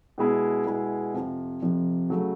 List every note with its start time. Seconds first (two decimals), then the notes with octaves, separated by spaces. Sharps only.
0.18 B2 G#3 B3 E4 G#4
0.66 B2 G#3 B3 E4 G#4
1.14 F2 C3 F3
1.62 F2 C3 F3
2.10 C#3 F#3 A3